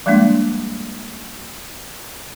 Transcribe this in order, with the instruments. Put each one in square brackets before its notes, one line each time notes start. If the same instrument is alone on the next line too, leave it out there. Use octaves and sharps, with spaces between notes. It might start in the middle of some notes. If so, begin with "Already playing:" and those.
[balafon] F3 G3 G#3 A#3 D4